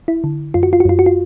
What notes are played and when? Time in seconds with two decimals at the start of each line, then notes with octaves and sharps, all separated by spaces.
0.08 E4
0.24 D3
0.54 F#2 F4
0.63 F#4
0.73 F4
0.80 F#4
0.85 F#2 F4
0.99 F#4
1.06 F4